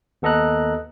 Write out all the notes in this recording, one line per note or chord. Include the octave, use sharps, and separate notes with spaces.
D#2 B3 A4 D#5 A#5 F#6